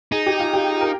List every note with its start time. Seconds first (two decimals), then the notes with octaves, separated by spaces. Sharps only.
0.12 D#4 G#4
0.26 G4
0.40 F4
0.53 G4
0.81 A#4